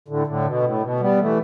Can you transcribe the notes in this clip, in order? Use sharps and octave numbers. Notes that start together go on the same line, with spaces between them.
A2 D3
A2 D3
B2
A2
B2
G3 B3
E3 A3